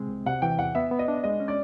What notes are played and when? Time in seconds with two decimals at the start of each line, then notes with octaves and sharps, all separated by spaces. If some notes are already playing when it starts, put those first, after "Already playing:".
Already playing: C3 G#3 C4
0.09 C2
0.26 C3 F#5
0.42 E3 G5
0.59 E2 F#5
0.75 B3 E5
0.91 B3
0.99 D#5
1.08 D4
1.24 G#3 D#5
1.40 C#4
1.48 D5